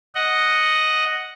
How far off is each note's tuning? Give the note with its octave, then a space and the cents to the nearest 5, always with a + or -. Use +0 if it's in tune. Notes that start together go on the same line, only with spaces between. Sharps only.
D#5 +0 F#5 +0